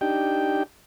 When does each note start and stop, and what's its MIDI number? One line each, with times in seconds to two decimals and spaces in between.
0.01 0.63 62
0.01 0.63 63
0.01 0.63 67
0.01 0.63 79